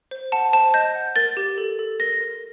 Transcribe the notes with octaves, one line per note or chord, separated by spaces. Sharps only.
C5
F#5 A5
C5 A5
D#5 G6
F#5
A#4 A6
G4
A4
A4
A#4 A#6
A#4